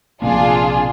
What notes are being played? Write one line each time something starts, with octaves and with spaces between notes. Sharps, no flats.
A#1 C3 A#3 D4 F4 G#4